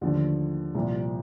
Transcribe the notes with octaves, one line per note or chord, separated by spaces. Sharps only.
D#2 D3 F3 A3
C2 A#2 F3